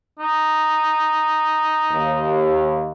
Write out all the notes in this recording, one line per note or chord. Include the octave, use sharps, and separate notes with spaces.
D#4
D#2